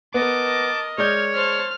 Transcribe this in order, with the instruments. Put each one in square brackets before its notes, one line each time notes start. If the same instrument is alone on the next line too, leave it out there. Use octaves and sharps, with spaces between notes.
[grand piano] B3 [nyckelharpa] A#4 D#5 [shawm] A5 [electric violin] D6
[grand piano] G#3 D5 G6 [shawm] C#5 [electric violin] F6 G#6
[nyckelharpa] C5 A5 [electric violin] F6